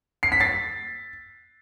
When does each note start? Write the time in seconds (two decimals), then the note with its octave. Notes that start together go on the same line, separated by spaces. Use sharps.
0.23 C7
0.32 B6
0.40 A6 C7